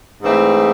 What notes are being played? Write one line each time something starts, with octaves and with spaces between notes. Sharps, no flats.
G#2 E3 A3 C4 E4